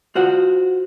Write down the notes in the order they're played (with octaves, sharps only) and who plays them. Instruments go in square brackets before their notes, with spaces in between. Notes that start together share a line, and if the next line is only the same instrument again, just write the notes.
[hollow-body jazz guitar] F4 F#4 C5 F#5